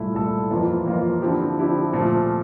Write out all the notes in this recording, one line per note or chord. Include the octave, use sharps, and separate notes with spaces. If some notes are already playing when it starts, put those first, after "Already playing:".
Already playing: C2 A#2 A3 E4 A4
C2 A#2 A3 E4 A4
F2 E3 A#3 F4
F2 E3 A#3 F4
D3 F3 C4 E4 G4
D3 F3 C4 E4 G4
A#2 F3 A3